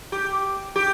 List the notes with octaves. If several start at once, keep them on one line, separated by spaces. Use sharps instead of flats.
G4
G4